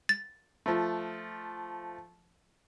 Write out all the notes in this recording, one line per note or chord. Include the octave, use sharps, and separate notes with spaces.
A6
F3 A3